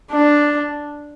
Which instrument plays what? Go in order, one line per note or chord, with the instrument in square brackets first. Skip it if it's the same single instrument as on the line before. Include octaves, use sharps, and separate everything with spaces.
[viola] D4